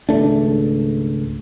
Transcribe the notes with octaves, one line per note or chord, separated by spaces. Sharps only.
G#1 C#2 A3 D4